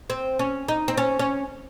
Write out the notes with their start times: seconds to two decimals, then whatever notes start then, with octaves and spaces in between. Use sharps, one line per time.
0.10 C4
0.39 C#4
0.68 D#4
0.88 C4
0.97 C#4
1.19 C#4